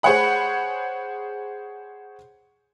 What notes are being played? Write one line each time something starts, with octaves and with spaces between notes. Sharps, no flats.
G#4 C5 C#5 F#5 B5